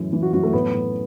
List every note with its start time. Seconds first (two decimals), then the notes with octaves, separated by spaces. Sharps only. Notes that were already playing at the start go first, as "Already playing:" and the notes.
Already playing: F#2 A2 E3
0.13 E3
0.22 F#4
0.33 F#2 F#4
0.43 A3
0.53 A2 B3
0.73 A2